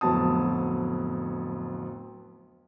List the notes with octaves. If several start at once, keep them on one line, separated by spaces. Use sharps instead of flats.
D1 F2 F#3 B3 A5 D#6